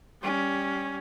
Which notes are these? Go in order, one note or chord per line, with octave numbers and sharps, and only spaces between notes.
G3 C#4